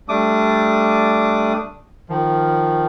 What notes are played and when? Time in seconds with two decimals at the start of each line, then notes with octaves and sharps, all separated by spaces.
0.09 G3 A3 D4 D6 D#6
2.09 D#3 F3